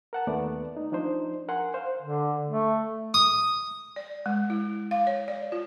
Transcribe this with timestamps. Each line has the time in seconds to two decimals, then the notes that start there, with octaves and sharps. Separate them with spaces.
0.13 A#4 F#5 A5
0.27 D#2 A3 B3 D5
0.77 D#4
0.92 F3 D4 D#4 C5
1.49 A#4 F#5 G#5 C6
1.74 C5 F5
2.02 D3
2.49 A3
3.14 D#6
3.96 D5
4.26 G#3
4.50 E4
4.91 F5
5.07 C#5
5.28 D5
5.52 F4